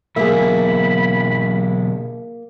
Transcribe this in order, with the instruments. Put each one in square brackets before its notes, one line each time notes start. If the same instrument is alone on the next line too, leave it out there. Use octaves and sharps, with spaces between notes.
[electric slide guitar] B2 E3 F#3 [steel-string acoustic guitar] A#3 [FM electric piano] G#4 E5 [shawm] B5